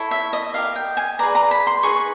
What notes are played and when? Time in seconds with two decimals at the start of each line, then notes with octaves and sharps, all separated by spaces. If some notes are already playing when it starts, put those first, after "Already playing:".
Already playing: E4 A4 C#5
0.11 E5
0.33 D#5
0.54 G4 A#4 D#5 F5
0.76 G5
0.97 G#5
1.19 G#4 B4 D5 A#5
1.35 A#5
1.51 B5
1.67 C6
1.83 D#4 G#4 B4 C#6